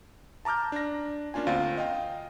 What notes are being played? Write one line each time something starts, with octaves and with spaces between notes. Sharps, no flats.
A5 A#5 D6 F6 G6
D4 A#6
A#3 C#4 D4 F4 G#5
D2 C4 F4 F5
D#5 F5 G5